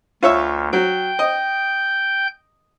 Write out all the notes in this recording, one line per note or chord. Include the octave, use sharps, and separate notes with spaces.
D2 F4 C#5 E5
F#3 G5 G6
D#5